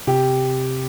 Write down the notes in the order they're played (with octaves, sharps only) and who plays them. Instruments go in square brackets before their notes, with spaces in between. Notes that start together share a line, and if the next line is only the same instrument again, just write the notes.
[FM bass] C3 [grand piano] G4